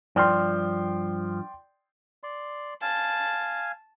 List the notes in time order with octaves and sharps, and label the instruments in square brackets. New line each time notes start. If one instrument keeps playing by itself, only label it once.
[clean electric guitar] G2 F3 [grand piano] D5 G5 C6
[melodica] D5 C6
[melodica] F5 G#5 [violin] A5